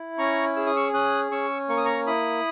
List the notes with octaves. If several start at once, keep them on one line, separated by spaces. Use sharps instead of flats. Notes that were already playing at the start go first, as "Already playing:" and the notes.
Already playing: E4
C#4 A#5 C#6
G#4 E6
D#6
C#6 E6
C#4 D#6 F#6
C#4 C#6 E6
A#3 C#6
D#6
A#5 C#6
E4 B5 D#6